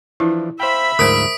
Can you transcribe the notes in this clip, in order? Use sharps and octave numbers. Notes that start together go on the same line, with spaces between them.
E3 F3 D4 E4
C5 E5 F5 G5 B5
D2 G#2 F3 A#4 C5 D#6 B6 D7